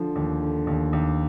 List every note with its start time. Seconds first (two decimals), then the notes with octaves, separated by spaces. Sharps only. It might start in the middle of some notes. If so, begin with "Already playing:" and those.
Already playing: D3 F3
0.16 D#2
0.42 D3
0.67 D#2
0.93 D#2